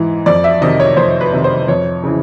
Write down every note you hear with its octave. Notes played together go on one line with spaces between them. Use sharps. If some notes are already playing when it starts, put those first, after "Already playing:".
Already playing: G#2 E3
F2 D5
E5
C3 D#3 D#5
C#5
F2 C5
B4
C3 D#3
C5
F2 C#5
C#3 E3